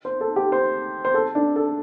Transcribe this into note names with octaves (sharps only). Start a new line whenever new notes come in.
C5
A4
G4
C5
C5
A4
D4
A4